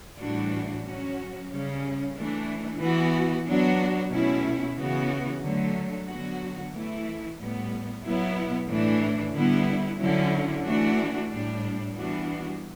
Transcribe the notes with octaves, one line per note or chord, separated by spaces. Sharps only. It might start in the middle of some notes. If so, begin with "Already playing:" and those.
A2 E3 G3 D4 F#4
F#3 C#4 F#4
C#3 G3 C#4
E3 A3 D4
E3 B3 F#4
F#3 B3 D4 F#4
B2 A3 C#4 E4
C#3 E3 B3 F#4
D3 F#3 A3
D3 F#3 B3 F#4
E3 A3 E4
A2 G3 B3
B2 F#3 B3 E4
A2 E3 A3 D4
D3 G3 B3 E4
D3 F#3 C#4 E4
E3 A3 D4 F#4
A2 G3 D4
E3 G3 B3 D4 F#4